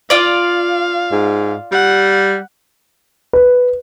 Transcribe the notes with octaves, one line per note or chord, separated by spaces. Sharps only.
F4 D5 F5
G#2
G3 F#5
B4